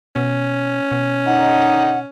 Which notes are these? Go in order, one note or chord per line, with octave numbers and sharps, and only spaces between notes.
B2 C#4
B2
D3 D#3 D#4 F#5